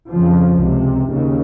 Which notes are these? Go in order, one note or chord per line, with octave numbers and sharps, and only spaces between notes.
F2 C#3 F3
C#2 C3
D#2 C#3